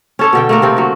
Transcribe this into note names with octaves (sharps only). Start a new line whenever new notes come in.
C#4 A4 C#5
B2 D3 G5
A3 A#3 A#4
C3 C4
D3 F#3